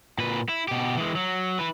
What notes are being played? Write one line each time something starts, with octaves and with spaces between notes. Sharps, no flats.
A#2 B4
E4
B2 G4
E3 G#3
F#3
E4 B4